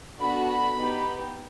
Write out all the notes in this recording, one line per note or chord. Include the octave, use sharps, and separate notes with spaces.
B3 D4 F#4 A4 B5
B5
B3 D#4 G4